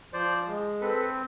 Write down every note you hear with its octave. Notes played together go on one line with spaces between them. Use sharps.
F3 C5 D5
G#3
C4 A4 B4